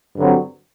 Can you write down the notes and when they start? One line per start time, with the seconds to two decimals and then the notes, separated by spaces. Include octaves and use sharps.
0.17 G2 D3 F#3 C4